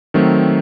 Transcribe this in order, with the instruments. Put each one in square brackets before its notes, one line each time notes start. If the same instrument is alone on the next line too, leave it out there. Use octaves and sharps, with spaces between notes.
[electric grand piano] D#3 F#3 A3 C4